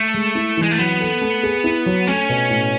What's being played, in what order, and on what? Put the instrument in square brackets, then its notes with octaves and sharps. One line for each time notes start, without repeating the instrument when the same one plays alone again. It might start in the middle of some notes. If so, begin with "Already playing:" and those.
Already playing: [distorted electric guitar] A3
[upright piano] G#3
E4
E3
[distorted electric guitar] G#3
A3
[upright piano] F#3 [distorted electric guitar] B3
[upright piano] A4
A3
G#4
E4
F#3
[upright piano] A3 [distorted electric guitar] C#4
[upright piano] B2
A2